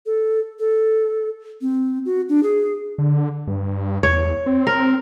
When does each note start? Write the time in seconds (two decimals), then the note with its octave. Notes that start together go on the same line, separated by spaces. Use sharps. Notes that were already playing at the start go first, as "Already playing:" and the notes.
0.06 A4
0.59 A4
1.61 C4
2.05 F#4
2.29 D4
2.43 G#4
2.98 D3
3.47 G2
4.03 E2 C#5
4.46 C4
4.67 A#4